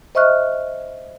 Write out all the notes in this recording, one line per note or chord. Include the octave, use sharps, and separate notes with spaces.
C5 D#5 E5 C#6 F6 F#6